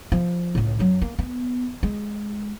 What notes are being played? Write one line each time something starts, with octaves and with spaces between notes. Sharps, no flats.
F3
C#2 A2
F#2 F#3
A#3
B3
G#3